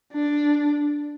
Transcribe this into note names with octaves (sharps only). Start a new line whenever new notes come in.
D4